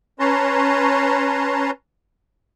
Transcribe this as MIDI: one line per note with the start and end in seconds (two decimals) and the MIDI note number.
0.19 1.71 61
0.19 1.71 71
0.19 1.71 73
0.19 1.71 81
0.19 1.71 82
0.19 1.71 84